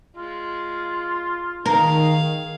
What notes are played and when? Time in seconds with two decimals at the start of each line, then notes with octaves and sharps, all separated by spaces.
0.16 G#3 F4
1.66 D#3 G#4 A#4 F5